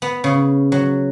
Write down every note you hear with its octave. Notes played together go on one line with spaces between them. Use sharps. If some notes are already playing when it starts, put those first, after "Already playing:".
B3
C#3
F#3